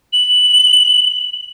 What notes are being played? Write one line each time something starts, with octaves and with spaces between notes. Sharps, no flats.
F#7